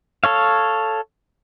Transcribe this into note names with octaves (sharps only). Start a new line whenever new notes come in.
A4 C#5 F5